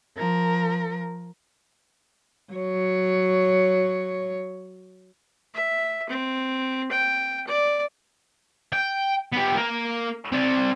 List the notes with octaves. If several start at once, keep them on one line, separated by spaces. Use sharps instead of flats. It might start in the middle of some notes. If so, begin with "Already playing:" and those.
F3 A#4
F#3 C#5
E5
C4
G5
D5
G5
B3 G4
A#3 A#4
C4 D5